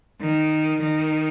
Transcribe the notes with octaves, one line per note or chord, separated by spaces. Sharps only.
D#3
D#3